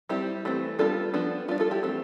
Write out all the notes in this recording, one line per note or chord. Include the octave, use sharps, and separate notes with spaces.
G3 C4 E4 G4
E3 A3 C4
G3 B3 D4 F4 A4
F3 B3 D4
G3 D4 F4
F4 A4
E4 G4
E3 A3 C4